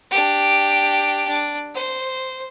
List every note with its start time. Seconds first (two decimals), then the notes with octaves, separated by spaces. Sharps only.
0.10 D4 G4
1.27 D4
1.75 C5